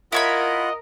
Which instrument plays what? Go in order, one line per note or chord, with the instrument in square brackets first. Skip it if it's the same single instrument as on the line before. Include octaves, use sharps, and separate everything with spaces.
[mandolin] E4 C#5 B5 [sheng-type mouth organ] F4 F#5 [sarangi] A#4 [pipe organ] D#5